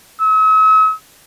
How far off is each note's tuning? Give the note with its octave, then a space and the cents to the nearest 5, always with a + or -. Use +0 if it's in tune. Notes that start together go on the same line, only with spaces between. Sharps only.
E6 -45